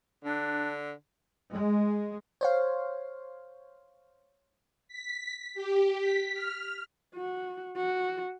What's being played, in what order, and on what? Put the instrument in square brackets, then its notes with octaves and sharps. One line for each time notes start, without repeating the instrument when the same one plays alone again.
[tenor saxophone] D3 [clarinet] D4
[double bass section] G#3
[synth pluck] C5 C#5 F5
[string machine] B6
G4
B6
F6
[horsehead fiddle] F#4
F#4